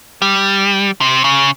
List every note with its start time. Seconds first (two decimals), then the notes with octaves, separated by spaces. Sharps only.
0.22 G3
1.01 C3
1.24 C#3